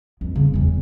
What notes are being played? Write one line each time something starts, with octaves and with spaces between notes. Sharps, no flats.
F2 E3
C#3 B3
E2 E3